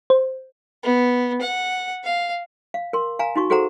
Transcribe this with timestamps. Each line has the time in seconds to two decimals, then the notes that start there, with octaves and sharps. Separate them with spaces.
0.10 C5
0.83 B3
1.41 F#5
2.04 F5
2.74 F5
2.93 A#4 C6
3.19 F5 G#5 A#5
3.36 D#4 F#4 C#6
3.50 F#4 G#4 A4 C5 F#5 A#5